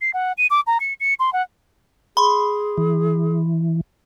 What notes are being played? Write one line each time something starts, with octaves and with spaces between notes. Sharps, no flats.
C7
F#5
D#7
D6
A#5
C#7
C#7
C6
F#5
G#4 B5 C6
E3